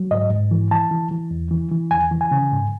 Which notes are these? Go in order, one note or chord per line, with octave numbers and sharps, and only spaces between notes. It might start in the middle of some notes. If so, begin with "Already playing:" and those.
Already playing: F#3
G#2 D#5
G#2
E3
E3 A5
E3
E3
E2
E3
E3
E2 G#5
E3
G#5
C#3
G#2